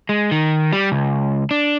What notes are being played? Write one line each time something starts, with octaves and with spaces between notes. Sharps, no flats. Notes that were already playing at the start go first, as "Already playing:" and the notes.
G#3
D#3
G3
C#2
D4